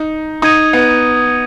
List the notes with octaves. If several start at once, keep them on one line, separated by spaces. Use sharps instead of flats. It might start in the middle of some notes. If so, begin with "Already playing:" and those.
Already playing: D#4
D#4 D#6 G#6 D#7
B3